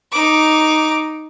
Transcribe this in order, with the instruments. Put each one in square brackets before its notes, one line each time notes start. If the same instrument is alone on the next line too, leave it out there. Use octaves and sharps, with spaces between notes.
[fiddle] D#4 D6